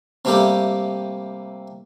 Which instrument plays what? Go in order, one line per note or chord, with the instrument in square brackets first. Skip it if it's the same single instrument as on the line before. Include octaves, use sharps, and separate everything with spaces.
[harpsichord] C3 G3 A3 A#3 G4